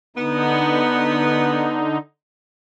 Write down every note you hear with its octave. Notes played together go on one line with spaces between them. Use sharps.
D3 B3 D#4